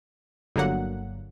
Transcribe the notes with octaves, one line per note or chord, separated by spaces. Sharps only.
G1 D3 F#3 A#3 F#5